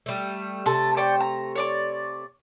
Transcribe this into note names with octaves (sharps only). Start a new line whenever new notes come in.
G3 A3
C3 A3 A4
D5 G5 C#6
A#5
C#5 D5 D6